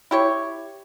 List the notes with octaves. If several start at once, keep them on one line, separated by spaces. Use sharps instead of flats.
E4 G4 C#5